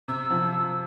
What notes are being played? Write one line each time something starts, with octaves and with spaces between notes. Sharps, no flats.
C3 E6
F3